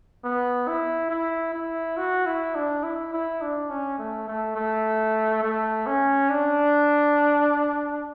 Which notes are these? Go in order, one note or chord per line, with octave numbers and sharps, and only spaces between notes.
B3
E4
E4
E4
F#4
E4
D4
E4
E4
D4
C#4
A3
A3
A3
A3
C#4
D4